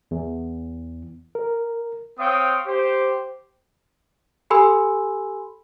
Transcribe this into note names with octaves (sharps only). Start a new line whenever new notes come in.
E2
A#4
C4 C#5 F5 G5 D#6
G4 C5
G4 A4 G#5 B5 C6 E6